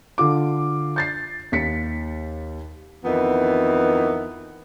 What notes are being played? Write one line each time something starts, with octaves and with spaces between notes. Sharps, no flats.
D3 F4 D6
G6 A6 C7
D#2 B6 C#7
F2 D#3 E3 B3